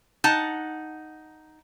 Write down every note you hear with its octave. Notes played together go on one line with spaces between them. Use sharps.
D#4 F#5 A5